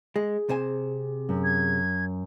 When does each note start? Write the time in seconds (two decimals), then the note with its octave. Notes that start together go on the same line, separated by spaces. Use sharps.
0.16 G#3 G#4
0.49 C3 C5 G#5
1.29 F#2
1.44 G#6